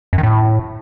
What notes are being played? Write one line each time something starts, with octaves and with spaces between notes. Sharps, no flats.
F#2
D#3
A2